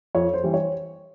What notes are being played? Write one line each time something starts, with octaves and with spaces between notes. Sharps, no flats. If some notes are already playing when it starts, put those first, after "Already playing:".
F2 C#5
C5
E3 G3
C#5